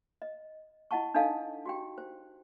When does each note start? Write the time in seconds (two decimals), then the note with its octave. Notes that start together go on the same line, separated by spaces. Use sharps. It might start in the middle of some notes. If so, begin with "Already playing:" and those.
0.22 D#5
0.91 E4 D#5 F#5 A5 C#6
1.14 D4 D#4 A4 D#5 F5 A5
1.66 F#4 G4 G5
1.98 C5